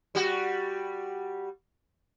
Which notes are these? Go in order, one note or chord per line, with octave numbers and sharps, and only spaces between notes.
G3 F#4